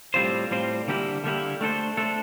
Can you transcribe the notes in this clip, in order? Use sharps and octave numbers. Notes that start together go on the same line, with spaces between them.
A2 G3 C4 F4 C5
A2 G3 C4 F4 C5
D3 G3 A#3 E4 G4
D3 G3 A#3 E4 G4
A3 D4 A4 C5
A3 D4 A4 C5